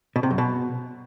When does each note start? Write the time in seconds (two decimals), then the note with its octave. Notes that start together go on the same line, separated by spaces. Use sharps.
0.16 B2
0.23 C3
0.31 F#2
0.38 B2